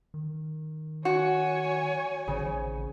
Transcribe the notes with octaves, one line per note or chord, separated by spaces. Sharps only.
D#3
F#4 C#5 G#5
A1 C#3